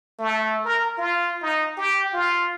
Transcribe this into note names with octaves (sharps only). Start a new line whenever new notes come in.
A3
A#4
F4
D#4
G4
F4